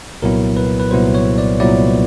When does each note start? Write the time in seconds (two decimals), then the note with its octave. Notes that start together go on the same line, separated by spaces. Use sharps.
0.22 C2 A#2 F#3 B3 E4 A#4
0.57 B4
0.80 B4
0.91 C2 A#2 F#3 B3 E4 C5
1.14 C#5
1.38 D5
1.60 C2 A#2 F#3 B3 E4 D5